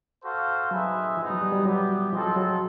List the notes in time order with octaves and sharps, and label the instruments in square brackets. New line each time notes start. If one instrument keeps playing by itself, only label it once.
[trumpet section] F#4 A4 C5 F5
[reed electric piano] F#3 [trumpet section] C4 D#4 G#4 B4 E5
[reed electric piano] F3 [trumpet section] G#3 B3 D#4
[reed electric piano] F#3
G3
G3
[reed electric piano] F#3 [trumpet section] B3 E4 G4
[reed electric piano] F3 [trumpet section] G#3 C4 F4 A4 C5
[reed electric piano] F#3
F#3